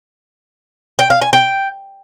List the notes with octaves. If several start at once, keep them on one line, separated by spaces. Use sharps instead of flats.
G5
F5
G#5
G5